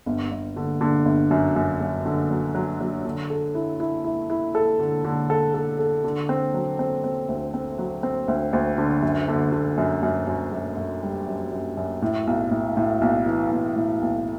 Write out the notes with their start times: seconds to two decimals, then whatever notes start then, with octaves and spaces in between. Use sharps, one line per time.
0.06 G1
0.31 G1
0.56 D3
0.81 D3
1.05 G1
1.31 F#2
1.56 F#2
1.81 F#2
2.06 D3
2.30 F#3
2.55 F#3
2.80 F#3
3.05 D3
3.30 A4
3.55 E4
3.80 E4
4.04 E4
4.30 E4
4.55 A4
4.79 D3
5.04 D3
5.30 A4
5.54 A4
5.79 A4
6.04 D3
6.29 C4
6.54 F#3
6.79 C4
7.04 C4
7.29 D2
7.54 C4
7.79 F#3
8.03 C4
8.28 D2
8.53 D2
8.78 D3
9.03 F#2
9.28 D3
9.52 D3
9.78 F#2
10.03 F#2
10.27 F#2
10.53 F#2
10.77 F#2
11.03 G3
11.27 F#2
11.51 F#2
11.77 F#2
12.02 A2
12.27 B1
12.51 A2
12.77 A2
13.01 B1
13.26 E3
13.51 B1
13.76 A2
14.01 B1